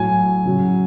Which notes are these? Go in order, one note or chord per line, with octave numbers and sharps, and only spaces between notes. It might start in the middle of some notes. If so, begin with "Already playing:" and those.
Already playing: A2 F#3 G#5
C#3 F#3